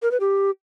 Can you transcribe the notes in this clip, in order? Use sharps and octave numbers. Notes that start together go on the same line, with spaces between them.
A#4
B4
G4